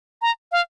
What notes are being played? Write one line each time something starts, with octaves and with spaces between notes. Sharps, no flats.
A#5
F5